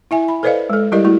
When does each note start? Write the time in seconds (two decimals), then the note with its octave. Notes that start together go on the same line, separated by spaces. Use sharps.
0.11 E4 E5 G#5
0.28 B5
0.43 A4 B4 C5 D5 D#5 F5
0.70 G#3 A4
0.92 G3 E4 G4 A#4 D5 D#5
1.04 A3 E4 F#4